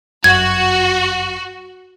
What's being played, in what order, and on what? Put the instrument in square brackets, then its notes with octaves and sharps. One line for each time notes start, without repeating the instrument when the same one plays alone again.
[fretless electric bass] G1 F#2 [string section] F#4 [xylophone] G#6